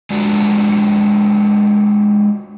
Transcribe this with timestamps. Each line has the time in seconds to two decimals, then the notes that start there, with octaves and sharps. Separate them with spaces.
0.10 G#3 D4 F4 F#4